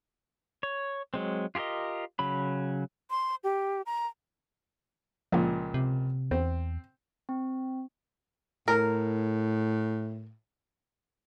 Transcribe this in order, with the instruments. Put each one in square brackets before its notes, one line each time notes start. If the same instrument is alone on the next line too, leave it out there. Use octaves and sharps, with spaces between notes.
[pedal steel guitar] C#5
F#3 G#3 C4
F4 G4 G#4 A#4 D#5
C#3 F#3 B5
[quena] C6
G4
A#5
[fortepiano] C#2 A#2 [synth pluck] F3 A#3
[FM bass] C3
[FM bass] E2 [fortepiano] C4
[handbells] C4
[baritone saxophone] A2 [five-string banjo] A#4